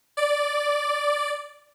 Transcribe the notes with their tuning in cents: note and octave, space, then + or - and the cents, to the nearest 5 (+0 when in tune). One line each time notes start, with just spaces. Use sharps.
D5 -5